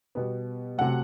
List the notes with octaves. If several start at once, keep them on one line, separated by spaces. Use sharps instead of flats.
B2 G3 B3
C3 F#3 A3 F#5